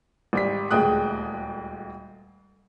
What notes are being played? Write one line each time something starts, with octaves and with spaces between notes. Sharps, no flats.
G#1 G3 B6
D#1 D2 G#3 G5 D#6 F#6